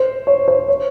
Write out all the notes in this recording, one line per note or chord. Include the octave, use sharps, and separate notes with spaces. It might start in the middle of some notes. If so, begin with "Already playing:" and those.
Already playing: C5
C#5
C5
C#5